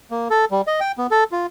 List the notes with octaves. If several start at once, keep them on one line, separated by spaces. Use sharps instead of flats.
A#3
A4
G3
D#5
G5
B3
A4
F4